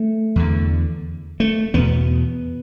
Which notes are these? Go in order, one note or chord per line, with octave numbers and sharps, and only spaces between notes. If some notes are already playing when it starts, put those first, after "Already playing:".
Already playing: A3
E2 D3
A3
E2 B2 B3